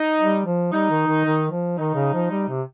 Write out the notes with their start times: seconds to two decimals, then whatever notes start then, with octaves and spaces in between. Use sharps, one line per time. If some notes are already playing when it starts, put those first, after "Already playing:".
Already playing: D#4
0.20 G3
0.46 F3
0.72 G3 D#4
0.90 D#3
1.07 D#3
1.25 D#3
1.51 F3
1.78 D#3 D#4
1.95 C#3
2.14 F3
2.31 G3
2.48 C3